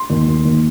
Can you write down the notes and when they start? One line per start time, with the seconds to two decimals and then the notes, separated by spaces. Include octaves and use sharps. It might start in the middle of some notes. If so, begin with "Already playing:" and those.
Already playing: C6
0.10 D#2
0.28 D#2
0.45 D#2